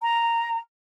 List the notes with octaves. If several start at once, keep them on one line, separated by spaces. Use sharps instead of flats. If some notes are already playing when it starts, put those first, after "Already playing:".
A#5